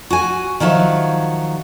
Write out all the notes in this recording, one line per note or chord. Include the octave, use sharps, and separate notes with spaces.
F#4 G#5
D#3 F3 F#3 E5